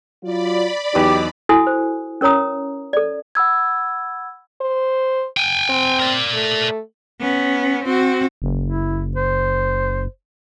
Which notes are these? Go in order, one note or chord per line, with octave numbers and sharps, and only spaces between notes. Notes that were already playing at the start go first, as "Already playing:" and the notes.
F#3 F4 D5 B5
E2 F#3 D#4 G4 B4 D6
E4 F#4 A4 G#5 D#6
C5
C#4 A#4 C#5 A#5 D#6
A4 D5
F#5 B5 E6 G#6
C5
G5 G#5
C4
A#4 D5
A3
B3 C#4
C4 F#4
F#1
E4
C5